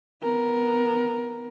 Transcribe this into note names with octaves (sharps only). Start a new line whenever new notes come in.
B3 A#4